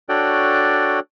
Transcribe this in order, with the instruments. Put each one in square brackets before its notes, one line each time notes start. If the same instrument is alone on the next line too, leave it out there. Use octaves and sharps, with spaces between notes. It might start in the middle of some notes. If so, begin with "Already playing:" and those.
[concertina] D4 F#4 A4 C#5 D5 G5